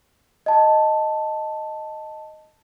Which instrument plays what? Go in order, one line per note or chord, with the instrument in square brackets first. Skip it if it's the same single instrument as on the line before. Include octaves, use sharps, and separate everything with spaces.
[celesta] D#5 A5